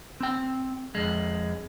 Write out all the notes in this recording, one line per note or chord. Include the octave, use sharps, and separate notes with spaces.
C4 G5
F2 G#3